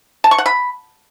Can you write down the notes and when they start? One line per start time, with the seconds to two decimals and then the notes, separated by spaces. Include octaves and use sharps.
0.24 A5
0.31 C#6
0.38 F#5
0.46 B5